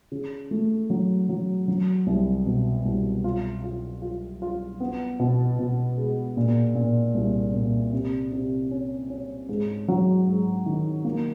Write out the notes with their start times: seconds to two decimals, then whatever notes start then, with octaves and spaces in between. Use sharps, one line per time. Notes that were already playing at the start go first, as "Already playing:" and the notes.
0.12 C#3
0.51 A3
0.90 F#3
1.29 F#3
1.68 F#3
2.07 C2
2.46 B2
2.85 C2
3.24 F4
3.64 F4
4.02 F4
4.42 F4
4.80 B3
5.20 B2
5.59 B2
5.98 G#3
6.37 A#2
6.75 A#2
7.15 C2
7.54 A#2
7.93 C3
8.32 C3
8.71 C#4
9.10 C#4
9.49 G#2
9.88 F#3
10.27 G#2
10.66 D#3
11.04 A#3